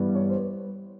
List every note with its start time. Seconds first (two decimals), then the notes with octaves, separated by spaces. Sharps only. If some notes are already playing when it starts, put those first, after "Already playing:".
Already playing: G2 E3 G3 B3
0.15 C#5
0.30 C5